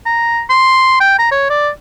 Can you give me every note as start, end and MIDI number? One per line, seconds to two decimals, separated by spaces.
0.06 0.41 82
0.49 0.99 84
1.00 1.16 79
1.19 1.28 82
1.32 1.49 73
1.50 1.69 74